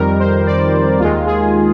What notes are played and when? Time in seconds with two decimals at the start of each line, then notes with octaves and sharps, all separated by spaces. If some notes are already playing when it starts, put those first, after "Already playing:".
Already playing: F2 D#3 G3 A#4
0.20 C5
0.46 D5
0.99 D#2 D#3 G#3 F4
1.26 G#4